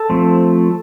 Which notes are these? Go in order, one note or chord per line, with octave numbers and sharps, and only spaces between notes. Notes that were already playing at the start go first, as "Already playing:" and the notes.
Already playing: A4 A5
F3 A3 C4